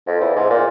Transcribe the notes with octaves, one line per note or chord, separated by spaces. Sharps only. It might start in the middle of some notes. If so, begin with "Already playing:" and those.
F2
E2
G#2
A#2